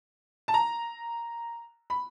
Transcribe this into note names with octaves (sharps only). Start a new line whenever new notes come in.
A5
A#5
B5